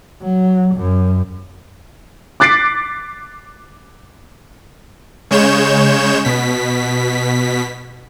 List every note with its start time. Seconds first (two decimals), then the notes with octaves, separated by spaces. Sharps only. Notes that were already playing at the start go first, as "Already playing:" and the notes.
0.22 F#3
0.75 F#2
2.40 D6 F#6 A6 B6 C7 D7
5.31 C#3 G#3 C#5 G6 E7
6.25 B2 B6